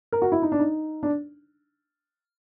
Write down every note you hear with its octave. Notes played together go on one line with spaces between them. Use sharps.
A#4
F#4
E4
D#4
D4
D#4
D4